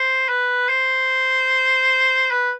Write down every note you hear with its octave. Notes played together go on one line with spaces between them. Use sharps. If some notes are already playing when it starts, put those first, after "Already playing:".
Already playing: C5
B4
C5
B4